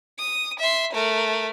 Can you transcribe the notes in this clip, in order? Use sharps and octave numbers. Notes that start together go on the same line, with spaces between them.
D#6
E5 C6
A3 A#4